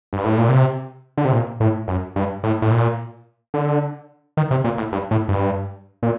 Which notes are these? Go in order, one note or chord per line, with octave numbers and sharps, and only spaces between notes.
G2
A2
A#2
C3
D3
C3
A#2
A2
F#2
G2
A2
A2
A#2
D3
D#3
C3
A#2
A2
G2
A2
G2
A#2